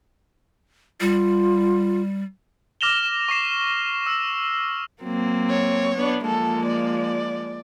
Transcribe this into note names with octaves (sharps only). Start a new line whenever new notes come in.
G3 F4
D6 F6 A#6 E7 F7 G7
C#6 D6 C7 E7
E6
F#3 A#3 C4
C#5
B3 D4
F3 G#3 A#3 A4
D5